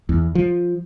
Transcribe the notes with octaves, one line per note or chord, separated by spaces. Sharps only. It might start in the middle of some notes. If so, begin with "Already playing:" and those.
E2
F3